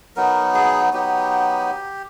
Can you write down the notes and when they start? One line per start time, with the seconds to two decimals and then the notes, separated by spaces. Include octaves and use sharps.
0.16 F#3 B3 D#4 A#4
0.54 G#4
0.93 F#3 B3 D#4 G4